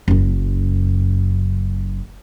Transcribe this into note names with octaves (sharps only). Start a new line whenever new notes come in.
F#1 F#2